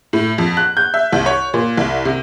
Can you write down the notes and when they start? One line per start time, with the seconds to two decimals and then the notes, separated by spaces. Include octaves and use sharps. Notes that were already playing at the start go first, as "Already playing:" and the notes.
0.13 A2
0.38 F2
0.57 F#6
0.77 G6
0.94 E5
1.12 C2
1.26 C#5
1.54 A#2
1.77 C2
2.05 C3